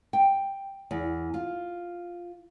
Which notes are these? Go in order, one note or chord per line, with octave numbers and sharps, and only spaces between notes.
G5
E2
F4